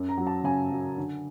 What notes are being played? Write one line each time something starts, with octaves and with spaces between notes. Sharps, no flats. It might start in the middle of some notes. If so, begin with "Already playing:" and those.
Already playing: F#2
A#5
F#3
A5
C#3 G#5
F#3
D3